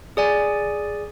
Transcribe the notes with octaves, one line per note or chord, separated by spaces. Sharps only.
G#4 D5 G#5